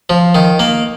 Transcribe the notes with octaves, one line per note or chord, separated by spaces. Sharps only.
F3
D#3
A#3